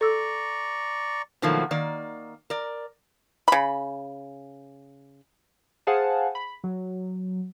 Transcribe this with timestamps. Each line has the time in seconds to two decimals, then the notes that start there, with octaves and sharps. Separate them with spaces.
0.01 A4 D5 A#5 C#6 E6
1.42 B2 D#3 F3 F#3 A3 A#3
1.71 D#3 A#3 D5
2.50 A#4 D5
3.48 C#3 B5
5.87 G#4 C5 F5 F#5 G#5 A5
6.35 B5
6.64 F#3